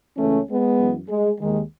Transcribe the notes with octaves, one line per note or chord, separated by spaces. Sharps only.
C#2 C#3 E3 A3 C#4
G#3 B3
F#2 E3
G#3
D#2 D#3 G#3